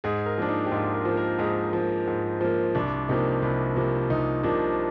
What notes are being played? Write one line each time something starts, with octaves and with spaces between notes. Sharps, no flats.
G#2 G#4
A#4
F3 A#3 D4
D#4
G4
G#2 F4
A#4
F3 A#3
A#4
G#2 G#4
F3 A#3
G#2
F3 A#3
C2 D4
C3 F3 A#3 D#4
C2
C3 F3 A#3
C2 D#4
C3 F3 A#3 D4